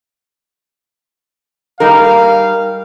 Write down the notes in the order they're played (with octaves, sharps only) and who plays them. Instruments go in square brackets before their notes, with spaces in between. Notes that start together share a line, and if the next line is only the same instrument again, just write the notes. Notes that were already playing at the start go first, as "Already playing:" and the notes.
[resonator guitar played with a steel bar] G3 D#4 A#4 [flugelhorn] F5